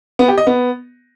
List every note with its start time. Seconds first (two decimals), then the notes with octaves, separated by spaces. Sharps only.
0.19 B3
0.28 G4
0.38 D#5
0.47 B3